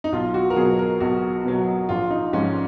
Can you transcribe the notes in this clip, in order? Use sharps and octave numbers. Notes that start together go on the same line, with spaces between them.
D#4
B1 F4
F#4
A#4
B2 F#3 G#4
A#4
B1 F#4
B2 F#3
A#1 F4
D#4
G#2 F3 G#3 C#4